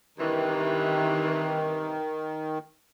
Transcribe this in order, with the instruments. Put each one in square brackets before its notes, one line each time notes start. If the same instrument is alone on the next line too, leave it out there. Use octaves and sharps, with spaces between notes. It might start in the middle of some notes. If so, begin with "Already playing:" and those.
[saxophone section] G2 C3 E3 [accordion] D#3